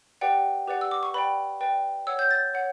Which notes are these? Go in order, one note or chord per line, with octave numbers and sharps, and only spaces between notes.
G4 B4 D5 F#5 G5
G4 B4 D5 F#5
E6
D6
C#6
B4 D5 G5 B5
B4 D5 G5
C#5 F#5 E6
G6
A6
C#5 F#5